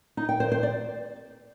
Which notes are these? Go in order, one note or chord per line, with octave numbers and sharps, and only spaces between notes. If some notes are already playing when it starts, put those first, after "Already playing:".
D#4
G5
C5
C5
D5